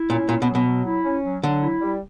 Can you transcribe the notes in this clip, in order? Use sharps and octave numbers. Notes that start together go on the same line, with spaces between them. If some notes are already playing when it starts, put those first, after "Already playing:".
Already playing: E4
A#2 C#4
A#2 C#4
B2
F#3
B2
F#3
E4
C#4
F#3
D3 F#3
E4
G3